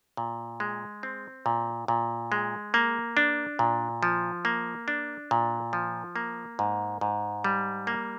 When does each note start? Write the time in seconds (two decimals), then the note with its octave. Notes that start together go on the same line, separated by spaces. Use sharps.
0.17 A#2
0.60 G#3
1.03 C4
1.46 A#2
1.88 A#2
2.32 G#3
2.74 A#3
3.17 D4
3.59 A#2
4.03 F3
4.45 A#3
4.88 D4
5.31 A#2
5.73 F3
6.16 A#3
6.59 G#2
7.01 G#2
7.44 G3
7.87 A#3